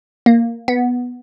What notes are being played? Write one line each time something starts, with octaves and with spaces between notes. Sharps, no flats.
A#3
B3